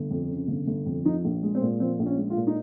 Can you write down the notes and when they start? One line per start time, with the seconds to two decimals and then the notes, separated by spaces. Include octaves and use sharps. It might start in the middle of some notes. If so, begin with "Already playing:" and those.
Already playing: G1
0.11 F2
0.30 C#3
0.48 G1
0.67 G1
0.86 F2
1.05 F3 D#4
1.24 A#1
1.43 G#3
1.55 C4
1.62 A#2
1.80 F3 C4
1.99 A#1
2.06 C#4
2.17 G#3
2.30 F4
2.37 A#2
2.47 D#4